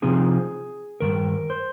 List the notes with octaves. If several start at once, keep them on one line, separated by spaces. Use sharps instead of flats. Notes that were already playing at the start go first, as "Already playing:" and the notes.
C3 F3 C4 D#4 G#4
G2 D#3 A#4
C5